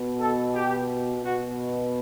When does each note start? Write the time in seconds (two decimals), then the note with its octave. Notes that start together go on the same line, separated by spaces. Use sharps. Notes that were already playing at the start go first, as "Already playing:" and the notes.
Already playing: B2
0.20 A4
0.54 G4
1.23 B2 F#4